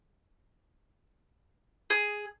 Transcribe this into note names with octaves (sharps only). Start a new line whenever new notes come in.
G#4